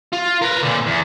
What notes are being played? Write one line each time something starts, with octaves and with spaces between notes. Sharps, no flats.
F4
A#4 B4
A#2 D3
E2